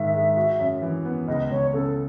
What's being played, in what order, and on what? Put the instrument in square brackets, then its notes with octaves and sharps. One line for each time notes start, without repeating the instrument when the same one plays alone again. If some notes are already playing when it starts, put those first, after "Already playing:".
Already playing: [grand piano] G#2 D#3 [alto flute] E5
[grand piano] G#3
F#4
F#2
E3
B3
[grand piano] C#2 [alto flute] D#5
[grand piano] C#2 [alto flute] C#5
[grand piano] C#3 [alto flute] A4